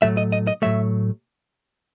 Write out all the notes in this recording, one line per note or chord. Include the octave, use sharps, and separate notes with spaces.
A2 F#3 A3 E5
D#5
D#5
D#5
A2 F#3 A3 E5